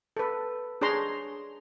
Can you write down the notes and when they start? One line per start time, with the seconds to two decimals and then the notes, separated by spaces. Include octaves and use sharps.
0.17 A4 B4
0.81 D4 G#4 C#5 A#5 C6